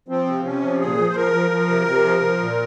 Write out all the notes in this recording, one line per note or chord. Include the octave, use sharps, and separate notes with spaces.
F3 C4
C3
C3 C#4
F3
A#2 G#4
F3
C5
F3 A#4
F3
F3
C3
C3
F3
F3
A#2